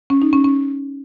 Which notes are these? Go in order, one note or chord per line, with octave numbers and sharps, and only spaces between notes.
C#4
D#4
C#4
C#4